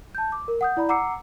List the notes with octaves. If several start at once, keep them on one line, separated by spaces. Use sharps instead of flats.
A5 G6
D6
A#4
F#5 D#6 G6
E4 D5 A#5 B5 G6
F#5 A#5 D6 E6 C7 C#7